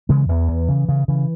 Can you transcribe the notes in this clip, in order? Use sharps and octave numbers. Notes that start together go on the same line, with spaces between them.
C#3 E3 G#3
E2 E3
E2
C#3
C#3
C#3 E3